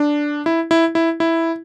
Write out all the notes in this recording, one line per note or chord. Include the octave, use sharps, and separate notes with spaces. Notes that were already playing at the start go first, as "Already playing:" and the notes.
Already playing: D4
E4
E4
E4
E4